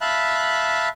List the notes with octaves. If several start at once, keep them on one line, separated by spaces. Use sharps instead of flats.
E5 F5 A5 B5 F#6